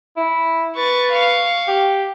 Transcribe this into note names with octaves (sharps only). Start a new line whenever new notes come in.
E4
B4 C#6 A6
F5 C#6
G4